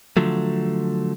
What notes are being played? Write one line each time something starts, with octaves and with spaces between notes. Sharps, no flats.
D3 F3 F#3 A3